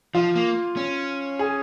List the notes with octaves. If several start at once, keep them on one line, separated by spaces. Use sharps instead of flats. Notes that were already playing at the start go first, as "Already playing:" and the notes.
F3 F4
A#3
C#4
G#4